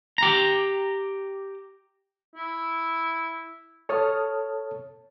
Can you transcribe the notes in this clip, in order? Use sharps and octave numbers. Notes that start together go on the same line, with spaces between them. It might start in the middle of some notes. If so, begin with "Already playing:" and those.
G4 A#5
E4
A4 C#5 A5 D#6 F6